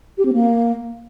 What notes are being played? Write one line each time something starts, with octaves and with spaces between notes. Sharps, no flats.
G4
C4
A#3